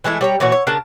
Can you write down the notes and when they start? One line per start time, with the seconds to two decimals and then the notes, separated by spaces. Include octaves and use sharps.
0.04 E3 G#3 A3 E4
0.21 G3 C#5 A#5
0.40 A#2 E3 F#4 C#5
0.52 C#5
0.67 C#3 D4 A#4 A5